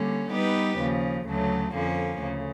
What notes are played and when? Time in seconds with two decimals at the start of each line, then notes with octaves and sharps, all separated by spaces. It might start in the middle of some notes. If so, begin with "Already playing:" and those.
Already playing: D3 G3 A#3 C#4
0.31 G3 B3 D#4 G4 B4
0.78 D#2 C#3 F3
1.26 D2 C#3 F#3 A3
1.73 F2 D3 F3 A#3 C#4
2.20 D2 C#3